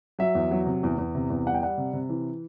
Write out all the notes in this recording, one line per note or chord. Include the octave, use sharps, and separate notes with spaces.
F#3 E5
E2
F#3
C3
E2
E2
C3
E2
G3 F#5
G5
G3 F#5
C3
C3
E3